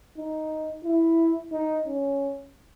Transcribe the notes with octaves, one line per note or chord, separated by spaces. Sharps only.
D#4
E4
D#4
C#4